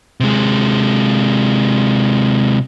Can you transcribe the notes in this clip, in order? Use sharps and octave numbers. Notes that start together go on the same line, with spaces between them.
C3 G#3